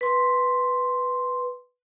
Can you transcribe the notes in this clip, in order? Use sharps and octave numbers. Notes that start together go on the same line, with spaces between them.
B4 C6